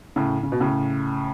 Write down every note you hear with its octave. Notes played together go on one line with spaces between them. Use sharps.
A2 C#3
C#3
B2
A2 C#3